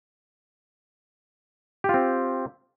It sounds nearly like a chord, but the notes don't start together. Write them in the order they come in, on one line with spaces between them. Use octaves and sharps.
G4 F4 C4